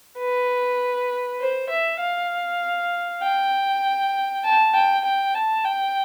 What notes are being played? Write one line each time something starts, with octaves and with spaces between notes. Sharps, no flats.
B4
C5
E5
F5
G5
A5
G5
G5
A5
G5